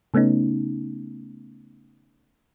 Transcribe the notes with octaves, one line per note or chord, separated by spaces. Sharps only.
C#3 A3 B3 C#4 D#4